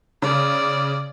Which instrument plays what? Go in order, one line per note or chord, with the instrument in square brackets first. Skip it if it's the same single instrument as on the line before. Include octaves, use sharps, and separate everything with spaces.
[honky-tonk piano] C#3 [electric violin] D5